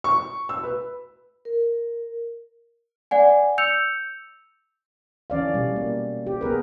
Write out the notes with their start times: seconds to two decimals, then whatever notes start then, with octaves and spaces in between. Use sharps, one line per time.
0.04 C#6
0.49 E6
0.63 B4
1.45 A#4
3.11 D5 F#5 G#5
3.58 E6 G6 C#7 F7
5.30 E3 C#4 D5 F5
5.54 B2 G3
5.76 A#3
6.27 G4
6.41 B3 G#4 A#4 B4